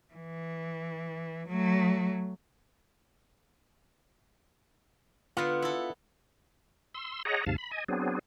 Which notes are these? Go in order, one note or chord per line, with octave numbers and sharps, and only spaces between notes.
E3
F#3 A3
D3 B3 F4
E4 A4
C6 E6
G#4 C#5 D#5 F#5 A#5
D#2 G#2 C3 F5 A5
B5
D#5 G#5
F#3 B3 C4 D4 G#4